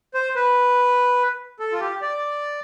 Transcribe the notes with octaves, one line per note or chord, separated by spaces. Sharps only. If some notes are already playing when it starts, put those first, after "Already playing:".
C5
B4
A4
F4
G4
D5